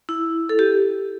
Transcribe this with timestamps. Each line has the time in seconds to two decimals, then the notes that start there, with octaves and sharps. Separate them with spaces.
0.09 E4
0.49 A4
0.59 G4